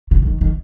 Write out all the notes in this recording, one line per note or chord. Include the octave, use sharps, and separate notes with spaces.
C#3
C#3
D#3
D#3